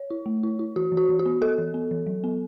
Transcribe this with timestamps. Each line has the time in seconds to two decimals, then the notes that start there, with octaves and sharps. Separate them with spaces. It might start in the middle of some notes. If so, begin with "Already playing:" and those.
Already playing: C#5
0.10 E4
0.26 A3
0.43 E4
0.59 E4
0.76 E3 F#4
0.92 E3
0.97 F#4
1.09 E3
1.19 F#4
1.26 B3
1.41 B3 A4
1.58 E3
1.74 B3
1.91 E3
2.07 F#3
2.24 B3